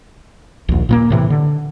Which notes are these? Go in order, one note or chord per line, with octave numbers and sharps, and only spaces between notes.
A#1 D#2
A#2 G3 A#3
A2 C3 E3
D3